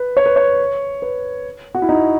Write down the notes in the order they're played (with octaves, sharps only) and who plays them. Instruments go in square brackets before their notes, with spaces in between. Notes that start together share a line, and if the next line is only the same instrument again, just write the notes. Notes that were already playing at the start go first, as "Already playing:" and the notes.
Already playing: [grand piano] B4
C#5
B4
C#5
B4
F#4
E4
D#4